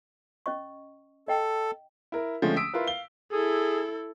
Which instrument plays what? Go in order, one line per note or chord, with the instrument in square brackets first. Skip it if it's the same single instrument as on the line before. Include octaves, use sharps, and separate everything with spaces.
[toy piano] C#4 D#5 C#6
[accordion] A4 [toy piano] D#5 G5
[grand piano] E4 A#4
D3 F3 G#3 A3 C4 C#4
D#6 E6 B6 D7
E4 F4 A#4 B4
F5 G7
[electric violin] E4 A4 [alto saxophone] G#4